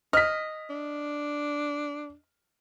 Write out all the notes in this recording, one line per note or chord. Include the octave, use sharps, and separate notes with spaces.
D#5 F6 B6
D4